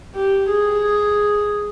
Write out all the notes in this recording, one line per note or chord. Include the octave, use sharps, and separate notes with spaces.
G4
G#4